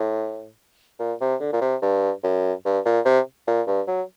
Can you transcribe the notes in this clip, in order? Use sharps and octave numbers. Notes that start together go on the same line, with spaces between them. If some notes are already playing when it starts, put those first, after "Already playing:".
Already playing: A2
A#2
C3
D3
A#2
C3
G2
F#2
G2
A#2
C3
A#2
G2
F#3